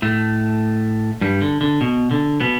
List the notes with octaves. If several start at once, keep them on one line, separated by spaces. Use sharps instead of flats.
A2 A3
G2 G3
D3
D3
B2
D3
B2 B3